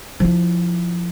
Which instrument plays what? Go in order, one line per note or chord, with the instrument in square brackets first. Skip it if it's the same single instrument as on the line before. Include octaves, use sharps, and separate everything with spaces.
[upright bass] F3 E4